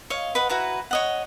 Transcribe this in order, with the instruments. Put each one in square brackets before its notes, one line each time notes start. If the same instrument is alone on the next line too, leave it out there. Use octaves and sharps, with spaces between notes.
[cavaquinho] C#5 D#5 F5
B4 D#5 F#5
E4 F#4 B4 A#5
C#5 D#5 F#5